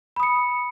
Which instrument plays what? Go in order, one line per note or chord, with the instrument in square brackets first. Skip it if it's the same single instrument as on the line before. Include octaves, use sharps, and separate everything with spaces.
[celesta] B5
D#6
C#7